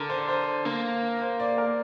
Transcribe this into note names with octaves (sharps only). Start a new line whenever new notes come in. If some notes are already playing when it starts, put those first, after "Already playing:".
Already playing: D3 A#4
C5
C5
A#3
C5
D5
A#4